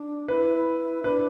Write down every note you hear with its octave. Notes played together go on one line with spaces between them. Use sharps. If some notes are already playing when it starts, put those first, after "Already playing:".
Already playing: D4
E4 B4
D4 B4